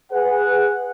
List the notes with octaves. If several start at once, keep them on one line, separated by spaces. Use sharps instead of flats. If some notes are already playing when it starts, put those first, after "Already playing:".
G#4 B4 F#5